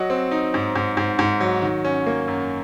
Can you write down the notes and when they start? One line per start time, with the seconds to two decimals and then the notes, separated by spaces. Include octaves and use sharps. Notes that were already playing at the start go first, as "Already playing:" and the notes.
Already playing: F#3 D#5 F#5
0.10 C4
0.31 D#4
0.54 G#2
0.76 G#2
0.97 G#2
1.19 G#2
1.41 F#3
1.62 D#3
1.85 C#4
2.06 A#3
2.28 F#2